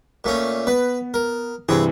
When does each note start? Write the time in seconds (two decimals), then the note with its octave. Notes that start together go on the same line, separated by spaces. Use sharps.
0.24 A#2 A3 C#4
0.67 B3 B4
1.14 A#4
1.69 G2 C3 E3 C4 G#4